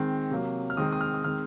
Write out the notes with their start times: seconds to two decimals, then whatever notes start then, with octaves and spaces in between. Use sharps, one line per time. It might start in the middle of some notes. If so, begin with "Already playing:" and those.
Already playing: D#3 G#3 C4
0.31 C3 F#3 A#3
0.70 F6
0.77 D#3 G#3 C4 D#6
0.92 D#6
1.01 F6
1.14 D#6
1.24 D#3 G#3 C4 F6